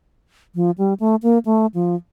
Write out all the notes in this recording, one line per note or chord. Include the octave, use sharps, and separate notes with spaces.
F3
G3
A3
A#3
A3
F3